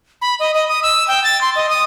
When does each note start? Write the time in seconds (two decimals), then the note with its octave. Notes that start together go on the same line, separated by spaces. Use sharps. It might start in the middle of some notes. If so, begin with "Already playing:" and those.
0.22 B5
0.40 D#5
0.54 D#5
0.69 D#6
0.83 E6
1.08 G5
1.24 A6
1.41 C6
1.56 D#5
1.69 D#6